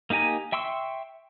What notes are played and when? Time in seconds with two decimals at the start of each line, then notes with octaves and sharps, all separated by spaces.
0.10 A#3 D#4 G4 G#5 A#5
0.52 E5 G5 C6 C#6 E6